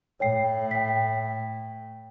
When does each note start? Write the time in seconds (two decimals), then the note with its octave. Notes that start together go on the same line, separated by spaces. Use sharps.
0.20 A2 C#5 G5 C7
0.71 G5 B6